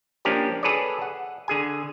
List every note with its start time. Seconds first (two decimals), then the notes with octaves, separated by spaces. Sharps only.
0.25 F3 A#3 C#4 D4 G4 A#4
0.63 G#4 A4 B4 C#5 D5
1.02 F#5
1.48 D3 G#4 G#5